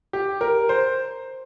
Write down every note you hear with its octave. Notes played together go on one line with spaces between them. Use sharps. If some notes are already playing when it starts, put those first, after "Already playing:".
G4
A#4
C5